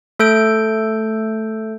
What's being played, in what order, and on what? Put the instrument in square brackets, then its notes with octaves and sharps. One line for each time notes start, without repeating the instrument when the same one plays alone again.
[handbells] A3 A4 G6 D7